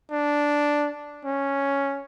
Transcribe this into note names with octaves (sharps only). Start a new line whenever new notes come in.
D4
C#4